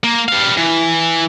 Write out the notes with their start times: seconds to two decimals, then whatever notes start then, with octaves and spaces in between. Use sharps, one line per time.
0.04 A#3
0.29 G3 F5
0.58 E3